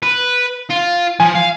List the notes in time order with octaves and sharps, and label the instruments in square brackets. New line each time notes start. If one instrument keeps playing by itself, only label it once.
[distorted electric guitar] B4
F4
[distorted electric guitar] F3 [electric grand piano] G#5
[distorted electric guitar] F5